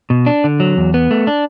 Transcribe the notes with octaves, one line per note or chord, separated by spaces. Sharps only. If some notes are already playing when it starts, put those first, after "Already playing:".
B2
D4
D3
F#3
E2
B3
A3
D4